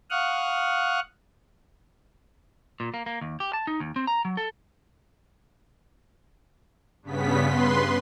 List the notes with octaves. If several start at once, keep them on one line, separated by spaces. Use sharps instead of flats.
F5 F#5 C#6 D#6 F6 F#6
A#2
A#3
A#3
D#2
G4
A5
D#4
D#2
C4
A#5
F#3
A4
G2 C#3 B3 B6
B4 C6